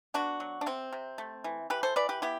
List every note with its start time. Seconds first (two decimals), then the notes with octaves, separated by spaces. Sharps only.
0.14 B3 D4 F#4
0.40 F#3
0.61 D4
0.66 C3 C4
0.93 C3
1.18 A3
1.44 E3
1.70 E3 G4 B4
1.83 A4 C5
1.96 E3 B4 D5
2.09 G4 B4
2.22 B3 E4 G4